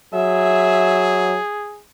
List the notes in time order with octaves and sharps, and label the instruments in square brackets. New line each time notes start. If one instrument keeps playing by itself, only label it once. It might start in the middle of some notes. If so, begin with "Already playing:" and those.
[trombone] F#3 [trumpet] G#4 [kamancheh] E5